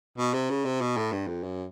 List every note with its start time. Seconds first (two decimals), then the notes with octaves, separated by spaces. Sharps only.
0.18 B2
0.34 C3
0.50 C#3
0.65 C3
0.81 B2
0.97 A2
1.12 G2
1.27 F2
1.44 F#2